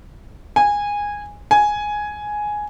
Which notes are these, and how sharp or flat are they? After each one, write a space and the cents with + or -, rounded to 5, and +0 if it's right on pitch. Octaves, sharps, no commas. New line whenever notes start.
G#5 -15
G#5 +5